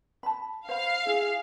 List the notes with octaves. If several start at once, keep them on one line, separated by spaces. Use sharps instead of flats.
A5 B5
C5 F5 B5
E4 G#4